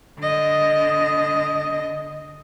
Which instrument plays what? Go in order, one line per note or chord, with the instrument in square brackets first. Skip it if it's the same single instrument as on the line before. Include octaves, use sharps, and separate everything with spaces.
[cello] D3 D#5